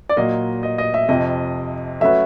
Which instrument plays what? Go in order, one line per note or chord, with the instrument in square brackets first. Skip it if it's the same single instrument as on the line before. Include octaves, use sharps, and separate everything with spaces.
[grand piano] D5
[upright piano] A#2 F#3 A#3 [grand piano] D#5
[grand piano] D#5
D#5
E5
[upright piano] F2 C3 F3 [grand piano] D#5
[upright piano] F#3 A3 C#4 F#4 B4 [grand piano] E5